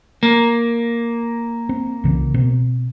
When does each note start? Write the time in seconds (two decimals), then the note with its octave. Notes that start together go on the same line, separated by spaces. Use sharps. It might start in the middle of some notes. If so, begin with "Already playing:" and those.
0.23 A#3
1.69 C4
2.04 C2 C#3 E3
2.34 B2 B3 C4